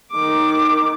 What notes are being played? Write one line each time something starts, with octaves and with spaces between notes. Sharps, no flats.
D#3 D6